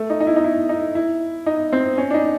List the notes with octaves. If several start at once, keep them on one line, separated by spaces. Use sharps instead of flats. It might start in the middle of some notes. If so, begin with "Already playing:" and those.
Already playing: A3
D#4
D#4
E4
D#4
E4
D#4
E4
D#4
C4
C#4
D4
D#4